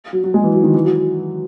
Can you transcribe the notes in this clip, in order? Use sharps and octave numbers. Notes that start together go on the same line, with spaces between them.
F#3
F#3
G#3
E3
F#3
D#3
E3
F#3